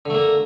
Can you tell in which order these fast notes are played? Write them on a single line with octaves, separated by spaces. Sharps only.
D3 A3 A#3